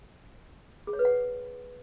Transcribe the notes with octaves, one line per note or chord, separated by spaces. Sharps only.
G#4
C#5
B4
F#5